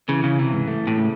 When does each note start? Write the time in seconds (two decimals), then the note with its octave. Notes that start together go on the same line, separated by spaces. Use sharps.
0.08 C#3 E3
0.24 C#3
0.39 C3 E3
0.53 G#2
0.67 A3
0.87 A2
0.97 C#3